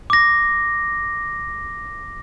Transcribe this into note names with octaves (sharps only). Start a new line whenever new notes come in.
D6 A#6